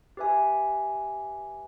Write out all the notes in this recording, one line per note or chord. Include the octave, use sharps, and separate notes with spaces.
G4 B4 E5 G#5